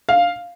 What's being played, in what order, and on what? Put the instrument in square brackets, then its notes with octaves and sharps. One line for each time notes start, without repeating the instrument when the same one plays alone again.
[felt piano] F5